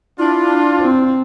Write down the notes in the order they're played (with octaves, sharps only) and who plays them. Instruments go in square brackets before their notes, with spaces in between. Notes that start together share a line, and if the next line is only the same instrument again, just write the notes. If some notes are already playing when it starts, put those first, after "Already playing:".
[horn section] D4 F4 [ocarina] E4
[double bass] C4